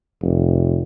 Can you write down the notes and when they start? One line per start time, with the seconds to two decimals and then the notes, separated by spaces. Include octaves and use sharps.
0.22 F1